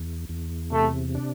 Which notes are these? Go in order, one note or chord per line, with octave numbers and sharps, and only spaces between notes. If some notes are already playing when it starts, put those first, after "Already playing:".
Already playing: E2
E2
C3 A3
D4